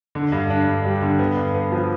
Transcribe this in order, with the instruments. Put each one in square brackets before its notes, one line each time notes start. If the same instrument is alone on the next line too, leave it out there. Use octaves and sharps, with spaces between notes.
[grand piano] D3
G2
D4
G2
G3
D3
B3
G2
B3
F3